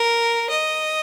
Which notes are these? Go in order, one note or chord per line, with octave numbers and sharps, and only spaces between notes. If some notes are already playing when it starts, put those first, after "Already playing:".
Already playing: A#4
D#5